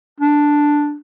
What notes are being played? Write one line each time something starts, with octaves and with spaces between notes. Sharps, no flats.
D4